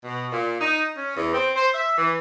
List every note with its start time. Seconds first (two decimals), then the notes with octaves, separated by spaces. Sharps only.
0.04 B2
0.32 A#2
0.60 D#4
0.97 C#4
1.16 E2
1.33 C4
1.55 C5
1.74 E5
1.97 E3